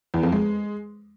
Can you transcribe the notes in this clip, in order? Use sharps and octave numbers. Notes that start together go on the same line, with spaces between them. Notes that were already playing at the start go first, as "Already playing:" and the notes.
E2
F2
G#3